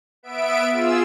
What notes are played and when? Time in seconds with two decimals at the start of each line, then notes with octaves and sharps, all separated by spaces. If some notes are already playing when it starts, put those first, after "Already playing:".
0.23 B3 E5 D7
0.70 F4 G#4 E6